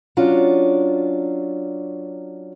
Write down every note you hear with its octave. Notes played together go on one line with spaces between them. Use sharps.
F#3 C#4 D4 F4